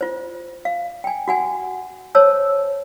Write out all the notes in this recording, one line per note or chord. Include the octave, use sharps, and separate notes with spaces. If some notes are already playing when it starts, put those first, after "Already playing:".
F4 C5
F5
G5 G#5
F#4 F#5 G#5
C5 C#5 A5 E6